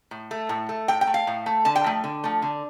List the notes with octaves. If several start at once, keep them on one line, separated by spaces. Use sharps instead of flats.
A2
A3
A2
A3
A2 G5
G5
A3
F5
A2
A3
D3 A5
G5
F3 A3
D3
F3 A3
D3